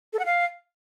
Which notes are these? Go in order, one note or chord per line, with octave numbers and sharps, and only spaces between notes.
A4
F#5
F5